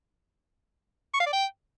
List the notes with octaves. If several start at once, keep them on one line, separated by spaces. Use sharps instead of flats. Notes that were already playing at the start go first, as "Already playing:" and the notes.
C#6
F5
D5
G5